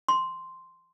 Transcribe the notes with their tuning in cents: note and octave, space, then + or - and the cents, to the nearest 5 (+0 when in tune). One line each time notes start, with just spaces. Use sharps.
C6 -5